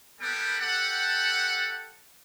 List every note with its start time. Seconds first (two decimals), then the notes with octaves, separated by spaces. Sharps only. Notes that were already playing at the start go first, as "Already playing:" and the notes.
0.20 G3 A#3 B3 A4 B4 G5
0.60 G4 A4 F#5